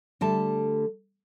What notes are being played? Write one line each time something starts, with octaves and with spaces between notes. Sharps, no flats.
D3 G3 A3 A5